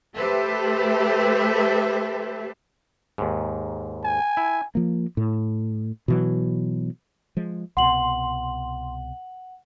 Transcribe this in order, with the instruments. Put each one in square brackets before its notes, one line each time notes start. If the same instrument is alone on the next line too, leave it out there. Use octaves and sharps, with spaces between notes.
[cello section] A3 G4 A4 B4 C5 E5
[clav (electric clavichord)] D#2 G#2
[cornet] G#5
[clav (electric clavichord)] E4
[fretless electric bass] F3 A#3
A2
B2 E3 F#3
F3 G#3
[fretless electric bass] C2 B2 [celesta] F#5 F#7 [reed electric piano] C6